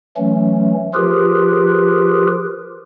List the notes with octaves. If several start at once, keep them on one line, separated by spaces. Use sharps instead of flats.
E3 F#3 A3 C#4
F3 F4 G4 G#4 A#4 B4